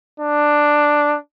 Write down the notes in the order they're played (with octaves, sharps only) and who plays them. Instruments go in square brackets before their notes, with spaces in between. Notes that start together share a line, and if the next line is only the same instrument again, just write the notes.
[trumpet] D4